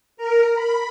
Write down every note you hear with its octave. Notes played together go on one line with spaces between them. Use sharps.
A#4
B5